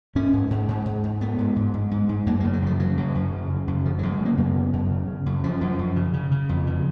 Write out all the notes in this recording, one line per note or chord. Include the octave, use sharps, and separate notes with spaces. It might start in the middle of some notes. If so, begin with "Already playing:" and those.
G#2 C#4
G#2
G#2
G#2
G#2
G#2
G#2 B3
G#2
G#2
G#2
G#2
G#2
F#2 A#3
A#3
C#3
F#3
F#2 F3
C#3 F#3
F#2
F#2
C#3
C#3
F#2
C#3 F3
F#3
F#2
G#3
C#3 A#3
F#2 B3
C#3
F#2
C#3
C#3
F#2
F#2 F3
F#2
F#2
C#3
C#3
C#3
F2
C#3